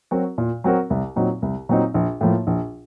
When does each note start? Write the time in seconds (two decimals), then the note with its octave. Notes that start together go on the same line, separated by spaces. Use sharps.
0.11 F#3 C4 F#4 A#4
0.38 A#2
0.64 F#3 C4 F#4 A#4
0.90 C2
1.16 A#2 F#3 C4 D#4
1.42 C2
1.69 A#2 F#3 C4 D#4
1.94 A#1
2.21 A2 F3 A#3
2.47 A#1